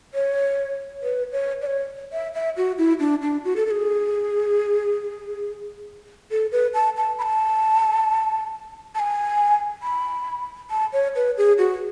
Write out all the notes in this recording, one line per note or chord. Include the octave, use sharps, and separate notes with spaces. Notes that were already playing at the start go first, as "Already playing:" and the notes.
C#5
B4
C#5
D5
C#5
E5
E5
F#4
E4
D4
D4
F#4
A4
A4
G#4
A4
B4
A5
A5
B5
A5
A5
G#5
B5
A5
C#5
B4
G#4
F#4